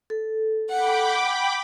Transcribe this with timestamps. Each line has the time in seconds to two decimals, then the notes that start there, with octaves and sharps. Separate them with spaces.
0.10 A4
0.70 F#5 G5 B5 D6